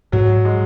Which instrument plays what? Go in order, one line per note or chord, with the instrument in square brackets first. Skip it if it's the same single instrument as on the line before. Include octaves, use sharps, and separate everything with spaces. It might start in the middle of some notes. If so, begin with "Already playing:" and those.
[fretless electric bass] G#2 [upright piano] F#3
[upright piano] G#3